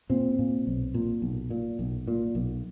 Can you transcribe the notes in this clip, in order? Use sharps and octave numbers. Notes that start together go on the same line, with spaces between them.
A#2 C4
A#2
B1
A#2
B1
A#2
B1
A#2
B1